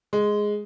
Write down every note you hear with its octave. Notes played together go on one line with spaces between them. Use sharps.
G#3